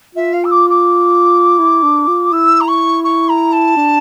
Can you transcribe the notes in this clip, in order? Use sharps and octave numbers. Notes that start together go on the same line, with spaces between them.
F4 E5
F5
E6
D6
D6
E4
D4
F4
E4 E6
A#5
C#6
C#6
A#5
A5
D4